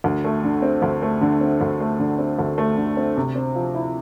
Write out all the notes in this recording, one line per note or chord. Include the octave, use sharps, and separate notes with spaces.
D2
A3
D3
C4
D2
A3
D3
C4
D2
A3
D3
C4
D2
A3
D3
C4
C3
C4
F3
E4